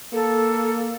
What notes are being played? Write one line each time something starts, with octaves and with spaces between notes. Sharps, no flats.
A#3 A4